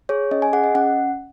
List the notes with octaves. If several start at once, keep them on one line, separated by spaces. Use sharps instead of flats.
G#4 C#5
C#4 D#5
G#5
G#4 F#5
D#5
C#4 F#5